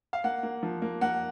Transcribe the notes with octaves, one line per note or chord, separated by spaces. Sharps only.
F5
A#3 F#5
A#3
F3
A#3
A#3 F#5